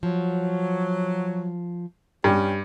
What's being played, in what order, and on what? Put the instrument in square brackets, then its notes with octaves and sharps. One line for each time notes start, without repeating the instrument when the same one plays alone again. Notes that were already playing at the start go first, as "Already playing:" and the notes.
[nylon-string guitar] F3 [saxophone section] F#3
[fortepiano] G2 [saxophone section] C#4 G4